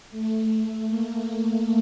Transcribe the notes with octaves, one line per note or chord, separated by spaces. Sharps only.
A3
A#3